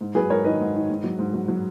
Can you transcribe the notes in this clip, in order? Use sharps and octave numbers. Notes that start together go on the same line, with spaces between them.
G#2
F#3 G#4 B4
G#2 A#4 C#5
D#3 B4 D#5
G#2
D#3
G#2
F#3
G#2
F#3
F#3